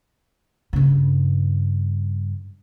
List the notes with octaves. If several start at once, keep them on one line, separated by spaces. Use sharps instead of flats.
G2 C#3